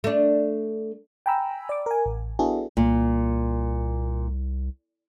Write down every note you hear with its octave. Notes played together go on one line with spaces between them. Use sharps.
A3 D4
G5 G#5 A#5 B5 E6
D5 D6
A#4 G#5
A1
B3 D4 E4 F#4 G#4 A4
C2 A#2